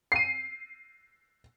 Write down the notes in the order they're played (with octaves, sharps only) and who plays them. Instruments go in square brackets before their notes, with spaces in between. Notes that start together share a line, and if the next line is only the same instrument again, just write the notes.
[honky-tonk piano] C7 D#7